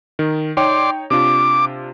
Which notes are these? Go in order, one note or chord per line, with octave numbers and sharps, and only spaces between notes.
D#3
D#4 C#5 D5 G5 C6
C3 D4 F4 D6